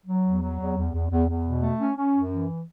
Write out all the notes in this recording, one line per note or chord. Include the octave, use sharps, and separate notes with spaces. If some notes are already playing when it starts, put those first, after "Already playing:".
F#3
E2
F#3
E2
E2
E2
E2
E2
B2
A3
C#4
C#4
F#2
E3